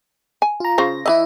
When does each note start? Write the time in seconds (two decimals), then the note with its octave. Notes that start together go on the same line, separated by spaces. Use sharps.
0.42 G#5
0.60 F4 A#5
0.78 C#3 F4 C5 A#6
1.06 E3 E4 D#5 E5